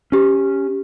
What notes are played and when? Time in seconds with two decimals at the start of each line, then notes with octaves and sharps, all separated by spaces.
0.12 C#4 G4